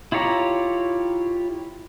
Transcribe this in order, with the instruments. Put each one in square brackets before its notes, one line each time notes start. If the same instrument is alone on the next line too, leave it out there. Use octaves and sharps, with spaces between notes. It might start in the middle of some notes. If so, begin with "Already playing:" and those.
[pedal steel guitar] E4 F4 G4 C#5 A#5